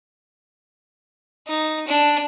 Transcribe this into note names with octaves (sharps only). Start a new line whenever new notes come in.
D#4
D4